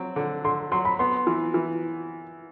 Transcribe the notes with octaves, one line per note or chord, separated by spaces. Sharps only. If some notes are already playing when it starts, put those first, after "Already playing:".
Already playing: F#3 C4
D3
D3 C6
F#3 C6
B5
B3 C6
E3
E3